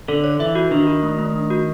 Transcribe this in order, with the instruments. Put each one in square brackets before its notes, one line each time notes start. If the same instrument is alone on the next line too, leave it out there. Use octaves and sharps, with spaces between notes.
[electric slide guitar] D3 [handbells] A4
[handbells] C#5
[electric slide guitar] E3 [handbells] E5
[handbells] F#4
[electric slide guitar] D#3 [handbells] D4
[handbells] F#4
A3
A3
D4
F#4